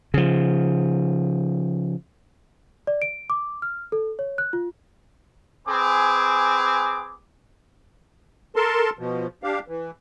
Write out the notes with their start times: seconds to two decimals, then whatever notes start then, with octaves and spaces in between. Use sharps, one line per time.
0.14 C#3 F3
2.87 D5
3.02 D7
3.30 D6
3.62 F6
3.92 A4
4.19 C#5
4.38 F#6
4.53 F4
5.67 C4 G#4 B4 G#5 D6
8.56 A4 A#4 A5 C6
8.99 B2 F3
9.43 D4 G4 F5
9.68 E3